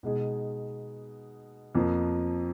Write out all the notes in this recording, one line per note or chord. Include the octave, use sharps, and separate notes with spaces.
B2 G#3 D#4 G#4
F2 F3 A#3